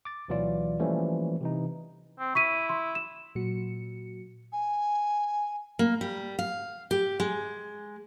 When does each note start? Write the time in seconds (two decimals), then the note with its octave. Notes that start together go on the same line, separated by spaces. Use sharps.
0.05 D6 A6
0.28 D2 B2 E3 F#3 F4 D5
0.79 E3 F3 G3 A3 A#3 C#4
1.41 C3 E3 D#4
2.19 C4
2.35 E4 C#6 B6 D#7
2.69 C6
2.95 E7
3.35 A#2 F#3 F#4 C#7
4.52 G#5
5.79 A#3
6.01 G3
6.39 F5
6.91 G4
7.20 G#3